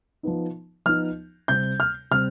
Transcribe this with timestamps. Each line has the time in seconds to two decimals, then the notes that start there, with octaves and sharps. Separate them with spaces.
0.23 F3 B3 D#4
0.86 F3 B3 D#4 F6
1.48 C3 G3 C4 G6
1.80 F6
2.11 C3 G3 C4 F6